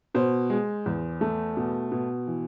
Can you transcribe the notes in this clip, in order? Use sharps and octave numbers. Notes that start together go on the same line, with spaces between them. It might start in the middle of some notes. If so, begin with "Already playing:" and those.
B2 C5
G#3
E2
A3
B2
B2
E3